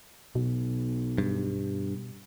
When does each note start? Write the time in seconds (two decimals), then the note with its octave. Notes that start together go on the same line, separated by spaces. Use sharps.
0.35 B1 B2
1.18 G2